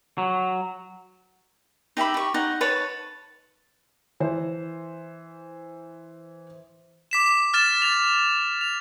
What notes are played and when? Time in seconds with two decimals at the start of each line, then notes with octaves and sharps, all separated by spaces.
0.18 F#3
1.97 D#4 G4 E5 B5
2.14 G4 C#6
2.34 D#4 F#5
2.61 B4 C#5 A5
4.20 E3 C5
7.11 D6 B6 E7
7.54 F6 A6 E7
7.82 A6 F7
8.61 F7